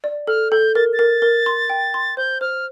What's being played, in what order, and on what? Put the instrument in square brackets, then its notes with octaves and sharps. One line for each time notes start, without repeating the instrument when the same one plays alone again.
[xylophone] D5
[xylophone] A4 [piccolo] F6
[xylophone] A4 [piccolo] G6
[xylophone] A#4 [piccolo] A6
[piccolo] A6
[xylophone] A#4
A#4
C6
G5
C6
[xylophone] C5 [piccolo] G6
[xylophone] C5 [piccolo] F6